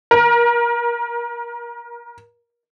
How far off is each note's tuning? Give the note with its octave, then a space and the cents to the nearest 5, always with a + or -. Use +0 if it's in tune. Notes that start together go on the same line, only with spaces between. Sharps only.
A#4 +30